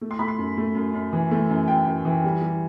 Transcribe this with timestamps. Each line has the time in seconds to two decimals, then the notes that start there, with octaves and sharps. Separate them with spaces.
0.01 A3
0.11 C6
0.19 A3 B5
0.28 C6
0.38 F#2
0.57 A3
0.75 F#2
0.94 F#2
1.13 E3
1.31 A3
1.50 F#2
1.68 F#2 G5
1.87 F#2
2.05 E3
2.24 G3
2.41 G3